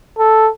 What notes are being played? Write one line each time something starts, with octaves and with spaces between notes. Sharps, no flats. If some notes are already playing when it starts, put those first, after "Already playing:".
A4